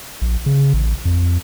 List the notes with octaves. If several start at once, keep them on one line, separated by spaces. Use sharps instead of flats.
A#1
C#3
A1
F2